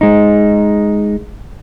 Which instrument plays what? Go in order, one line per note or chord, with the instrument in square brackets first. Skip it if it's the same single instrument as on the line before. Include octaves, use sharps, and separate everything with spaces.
[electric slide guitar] G#3 D#4